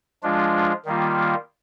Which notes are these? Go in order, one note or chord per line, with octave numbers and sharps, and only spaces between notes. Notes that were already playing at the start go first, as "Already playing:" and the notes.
F3 G#3 D4 F4
D#3 G3 A#3 F4